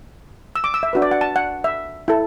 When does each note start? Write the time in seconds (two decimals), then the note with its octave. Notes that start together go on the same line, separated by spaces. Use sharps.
0.56 E6
0.64 D6
0.74 E6
0.83 E5
0.93 D4 F#4 B4
1.02 D5
1.11 F#5
1.21 A5
1.36 F#5
1.64 E5
2.08 E4 A4